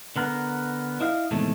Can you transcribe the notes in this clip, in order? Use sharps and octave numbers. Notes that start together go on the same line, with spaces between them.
D3 B3 A#4
E4 D#5 F5
E2 A2 C3 D#3 G#3 A3